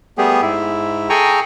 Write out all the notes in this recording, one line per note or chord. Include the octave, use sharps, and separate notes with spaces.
G3 A3 B3 G4 G#4
G#2 E4
G#4 A4 G5 G#5 A#5 C#6